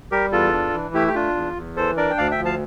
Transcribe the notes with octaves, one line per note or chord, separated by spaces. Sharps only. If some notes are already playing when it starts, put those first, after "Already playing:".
G3 G4 A#4
E2 F4 A4
D4
E3
A3 E4 G4
G4
D4 F4
E2
E2
E3 A4 C5
D4 A#4 D5
G5
D2 D5 F5
E5 G5
F3
F5 A5